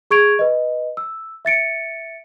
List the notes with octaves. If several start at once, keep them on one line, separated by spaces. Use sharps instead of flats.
G#4 C#6 G#6 D7 F7
B4 D#5
E6
E5 A6 C#7 D7